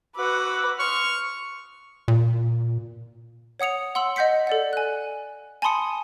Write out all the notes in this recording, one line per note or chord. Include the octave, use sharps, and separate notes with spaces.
F#4 B4 F#5 D6 E6
C6 C#6 D#6 F6
A#2
C#5 F#5 D#6 C#7 F7
F#5 C6 E6 F#7
D#5 F#5 G6 B6 C#7
A4 D5 F#5
G#5 F#6
G#5 A5 B5 C6 D#6 C#7